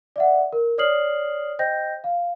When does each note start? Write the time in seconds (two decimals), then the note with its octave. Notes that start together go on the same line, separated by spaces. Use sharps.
0.16 D5 E5 F#5
0.53 A#4
0.78 C#5 D5 D#6 F6 C7 F#7
1.59 C5 D#5 G5 G6 A#6
2.04 F5